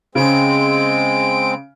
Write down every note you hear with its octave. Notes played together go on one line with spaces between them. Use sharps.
C#3 G#3 C4 D7